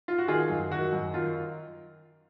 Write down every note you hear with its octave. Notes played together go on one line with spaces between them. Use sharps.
F4
F#4
D#3 F4 G#4
F#2
D#3 F#4
F#2
D#3 F4